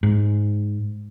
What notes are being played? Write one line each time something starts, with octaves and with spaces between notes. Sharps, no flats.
G#2